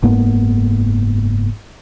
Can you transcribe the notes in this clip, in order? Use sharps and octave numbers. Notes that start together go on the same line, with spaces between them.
F#1 G#2 A#3 B3